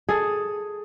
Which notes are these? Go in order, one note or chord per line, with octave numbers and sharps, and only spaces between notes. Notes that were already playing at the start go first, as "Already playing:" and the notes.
G#4 A4